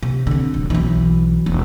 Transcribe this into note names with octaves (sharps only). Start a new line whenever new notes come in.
C3
D3 C4
D1
B1 E3
E1